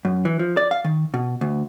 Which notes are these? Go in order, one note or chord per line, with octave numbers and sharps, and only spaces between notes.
F#2
E3
F3
D5
F5
D#3
B2
D2